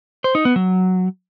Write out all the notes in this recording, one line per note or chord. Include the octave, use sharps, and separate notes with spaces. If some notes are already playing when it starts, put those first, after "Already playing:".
C5
D#4
B3
F#3